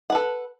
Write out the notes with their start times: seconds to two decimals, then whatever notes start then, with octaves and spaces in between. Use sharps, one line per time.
0.10 F#5
0.12 B4
0.15 A4